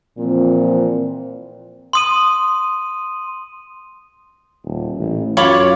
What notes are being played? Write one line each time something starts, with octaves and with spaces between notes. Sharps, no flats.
A#2 E3 F3 C4
C6 D#6 D#7
D#1
A1
F#2 F4 C#5 B5 D6